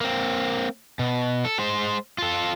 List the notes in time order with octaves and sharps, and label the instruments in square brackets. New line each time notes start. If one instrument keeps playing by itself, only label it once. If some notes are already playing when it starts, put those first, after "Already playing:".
[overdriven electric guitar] A#3 C4
B2
A4
G#3 C5
F4 A4